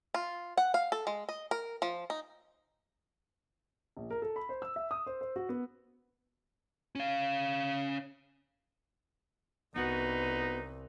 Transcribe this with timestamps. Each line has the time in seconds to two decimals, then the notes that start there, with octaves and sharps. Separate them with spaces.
0.14 F4
0.57 F#5
0.74 F5
0.92 A4
1.07 G#3
1.29 D#5
1.51 A#4
1.82 F3
2.10 D#4
3.97 A#1
4.10 A#4
4.22 A4
4.36 B5
4.49 C5
4.62 E6
4.76 E5
4.91 D#6
5.06 C5
5.21 C5
5.36 F#4
5.49 B3
6.95 C#4 F5
9.76 C2 B3 D#4 F#4 B4